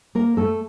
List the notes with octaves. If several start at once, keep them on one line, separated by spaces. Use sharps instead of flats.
A#3 A#4
A3 A4